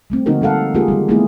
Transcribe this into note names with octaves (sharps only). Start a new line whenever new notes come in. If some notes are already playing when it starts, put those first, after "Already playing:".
G3 A3 C4
D3 F3 A#3 D#4 F#4 A#4
G3 G#3 A4 F5 F#5
G#3 A#3 F4 G4 G#4 A#4
D#3 G3 G#3
G3 A3 B3 C4 E4 G#4